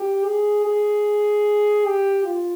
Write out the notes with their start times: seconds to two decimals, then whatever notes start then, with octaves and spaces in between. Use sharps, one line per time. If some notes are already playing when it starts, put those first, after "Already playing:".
Already playing: G4
0.26 G#4
0.66 G#4
1.85 G4
2.25 F4